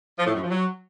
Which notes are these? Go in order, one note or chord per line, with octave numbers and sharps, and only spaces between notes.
F3
A2
F#2
F3
F#3